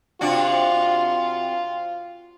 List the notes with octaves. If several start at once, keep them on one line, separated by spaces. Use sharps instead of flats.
C3 D4 F4 F#4